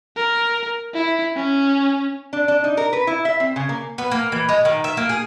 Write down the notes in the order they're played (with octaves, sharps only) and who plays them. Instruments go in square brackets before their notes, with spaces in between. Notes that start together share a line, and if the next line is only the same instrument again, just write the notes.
[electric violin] A#4
E4
C#4
[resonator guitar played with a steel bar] D4
D4
D#4
A#4
B4
E4
E5
C4
C#3
A#3
[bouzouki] B3
A#3
E3
G#3
D#3
E5
A#3
G#4